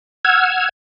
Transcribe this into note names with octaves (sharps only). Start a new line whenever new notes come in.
F#5 E6 F6 G#6